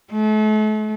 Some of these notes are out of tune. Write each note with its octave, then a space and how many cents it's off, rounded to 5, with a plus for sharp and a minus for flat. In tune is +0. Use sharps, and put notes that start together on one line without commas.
A3 -40